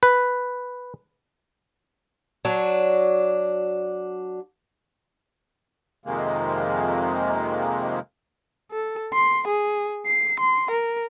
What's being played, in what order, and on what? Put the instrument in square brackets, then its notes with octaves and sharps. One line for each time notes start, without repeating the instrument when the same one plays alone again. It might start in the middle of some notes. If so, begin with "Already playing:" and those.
[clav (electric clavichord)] B4
[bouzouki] F#3 D4
[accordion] F2 C3 D#3 G#3 A#3
[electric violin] A4
C6
G#4
C7
C6
A#4